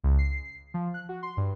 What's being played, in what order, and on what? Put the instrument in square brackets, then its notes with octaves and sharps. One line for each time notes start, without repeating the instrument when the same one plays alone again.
[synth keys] C#2
C7
F3
F#6
F#4
C6
G2